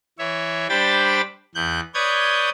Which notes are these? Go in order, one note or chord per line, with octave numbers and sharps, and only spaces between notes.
E3 C#5 E5
G3 D4 C5 G5 B5 A6
E2 F#6 G6
B4 C#5 D5 D#6 G6 G#6